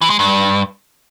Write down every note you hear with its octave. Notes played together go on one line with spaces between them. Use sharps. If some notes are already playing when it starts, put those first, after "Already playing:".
E3
G#3
G2